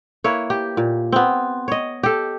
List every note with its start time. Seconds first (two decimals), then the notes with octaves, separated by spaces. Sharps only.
0.24 A#3 E4 B4 C#5
0.50 G4
0.77 A#2
1.12 B3 C4
1.68 C#5 D#5
2.03 G4 A4